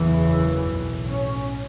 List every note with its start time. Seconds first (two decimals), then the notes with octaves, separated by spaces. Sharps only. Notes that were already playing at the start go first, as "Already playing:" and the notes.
Already playing: F#1 E2 C#3 E3
0.68 B1 A2
1.08 C#4